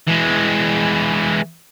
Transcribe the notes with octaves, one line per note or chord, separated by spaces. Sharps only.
E3 G#3